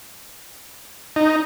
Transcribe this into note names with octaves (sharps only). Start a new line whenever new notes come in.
D#4